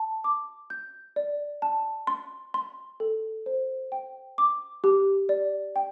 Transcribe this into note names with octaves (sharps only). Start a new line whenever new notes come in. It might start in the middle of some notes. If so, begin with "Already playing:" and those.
Already playing: A5
D6
G6
D5
A5
C6
C6
A4
C5
G5
D6
G4
D5
G5